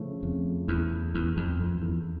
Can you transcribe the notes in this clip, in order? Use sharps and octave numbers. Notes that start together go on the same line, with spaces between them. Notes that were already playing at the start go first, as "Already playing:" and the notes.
Already playing: C#3 F3 A3
F2
E2
E2
F2
F2
E2